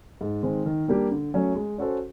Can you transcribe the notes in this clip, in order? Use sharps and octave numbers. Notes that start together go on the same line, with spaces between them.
G#2
D#3 G#3 C4
D#3
G3 A#3 D4 G4
D3
F#3 A3 C#4
G#3
C#4 F#4 A4 C5